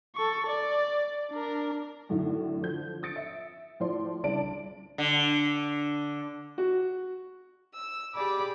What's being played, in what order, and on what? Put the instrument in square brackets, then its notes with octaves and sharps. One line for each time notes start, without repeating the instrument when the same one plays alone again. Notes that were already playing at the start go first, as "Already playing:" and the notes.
[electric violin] A4 C#6
D5
D4 A#4
[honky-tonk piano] F#2 A2 D3 D#3
D3 F3 G6
D#6 A6 C#7 D7
E5
A2 F3 C5 D5 C6
C2 C#3 D4 D5 A5 D7
[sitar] D3
[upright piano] F#4
[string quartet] E6
G4 G#4 D5 B5 D6